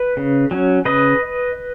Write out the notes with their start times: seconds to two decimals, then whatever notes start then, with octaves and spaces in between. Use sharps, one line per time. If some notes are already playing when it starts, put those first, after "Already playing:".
Already playing: B4
0.17 C#3
0.51 F#3 C#4
0.85 C#3 B4 D#5